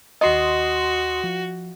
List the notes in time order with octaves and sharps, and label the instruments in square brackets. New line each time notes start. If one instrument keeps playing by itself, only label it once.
[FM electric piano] D#2 C6 D#6 [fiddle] F#4 [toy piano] D#5
[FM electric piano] F3